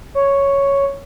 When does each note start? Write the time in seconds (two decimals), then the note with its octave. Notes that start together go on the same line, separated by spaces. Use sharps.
0.15 C#5